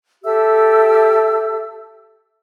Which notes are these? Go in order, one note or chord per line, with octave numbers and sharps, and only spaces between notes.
G4 A4 E5 E6